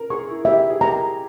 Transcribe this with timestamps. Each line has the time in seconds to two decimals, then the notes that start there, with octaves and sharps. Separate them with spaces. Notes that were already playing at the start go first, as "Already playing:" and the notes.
Already playing: A#4
0.10 G#4 C#6
0.28 E4
0.45 G4 E5
0.70 G#4
0.81 G4 A#5